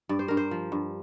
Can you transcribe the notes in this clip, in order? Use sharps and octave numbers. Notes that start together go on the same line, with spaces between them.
G2 D5
C5
G2 A#4
C5
F3
G2